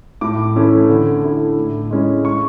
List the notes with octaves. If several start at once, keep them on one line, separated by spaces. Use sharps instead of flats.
A2 D6
E3 A3 C#4 E4
D3
A3 E4
A2
G#3 C#4 E4
C#6